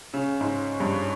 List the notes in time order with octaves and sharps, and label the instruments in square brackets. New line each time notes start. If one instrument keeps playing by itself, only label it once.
[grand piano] C#3 [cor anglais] C#5
[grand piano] G#2
G2